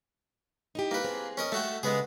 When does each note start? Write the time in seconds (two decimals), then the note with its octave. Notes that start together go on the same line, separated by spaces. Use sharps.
0.75 D#4 E4 G4
0.91 A#3 B4
1.04 C4 G#4
1.37 C#4 A#4 D#5
1.52 A3 F#4 A4 E5 G5
1.83 C#3 G#3 B3 G#4